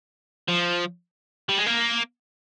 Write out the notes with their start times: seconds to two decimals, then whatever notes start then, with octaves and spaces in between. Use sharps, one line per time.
0.49 F3
1.49 G3
1.58 G#3
1.67 A#3